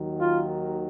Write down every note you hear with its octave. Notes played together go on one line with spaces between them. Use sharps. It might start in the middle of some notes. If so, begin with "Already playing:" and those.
Already playing: D#2 D#3 F#3
F4